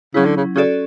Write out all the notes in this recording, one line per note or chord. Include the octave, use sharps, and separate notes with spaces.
C#3 F#3 C#4 E4
D3
C#3
C#3 C#4 F#4 A4 D5